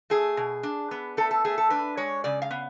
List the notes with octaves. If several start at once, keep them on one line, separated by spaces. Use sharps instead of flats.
A3 G#4
B2
D4
B3
A3 A4
A4
A3 G#4
A4
D4 B4
G#3 C#5
C#3 D5
F5
B3